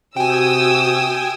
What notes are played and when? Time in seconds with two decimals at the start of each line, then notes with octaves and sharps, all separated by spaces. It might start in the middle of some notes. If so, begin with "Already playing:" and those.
0.17 C3 F#4 G5 G#5 D#6 E6